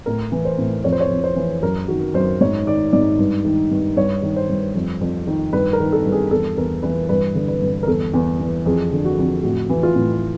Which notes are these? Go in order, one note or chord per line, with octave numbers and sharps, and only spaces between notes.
A2 A#4
E3
C5
A2
F2 C#5
C5
C#5
F2
C5
E3
F#2 A#4
D#3 F#4
F#2 C5
G#2 C#5
D#3 D5
G#2 D5
G2
D#3
G2
G2 C#5
D#3
C5
G2
F2
F2
D#3
G2 B4
A#4
D#3
A4
G2
G#4
E2 A4
E2 A#4
E3 B4
G2 B4
D3
B4
G2
A#4
E2 A4
E2
E3
F2 G#4
D3
F#4
F2
A2 F#4
E3
F4
A2